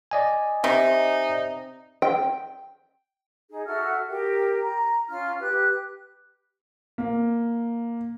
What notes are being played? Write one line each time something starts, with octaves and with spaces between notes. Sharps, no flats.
D5 D#5 G#5
C3 D#4
G5
D#4 G#4
F#4 A4 E5 F6
G4 A#4
A#5
C#4 F4 F6
G4 B4 F#6
A#3